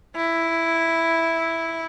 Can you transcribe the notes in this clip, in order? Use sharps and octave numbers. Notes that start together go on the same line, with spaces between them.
E4